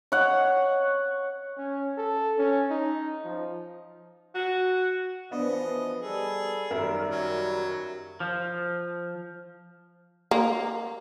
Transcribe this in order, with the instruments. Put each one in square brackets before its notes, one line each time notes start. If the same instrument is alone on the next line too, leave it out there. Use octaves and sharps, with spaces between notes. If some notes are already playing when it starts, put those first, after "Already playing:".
[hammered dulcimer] C#5 F#5
[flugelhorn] C#4
A4
C#4
D#4
F3
[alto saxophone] F#4
[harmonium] E3 F3 [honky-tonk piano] B3 D4 [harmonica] D#5
[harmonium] G3 A4 [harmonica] G#4
[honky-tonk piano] F#2 A#4 E5 [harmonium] D#3 G3
[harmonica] F#3
[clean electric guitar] F3
[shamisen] A#3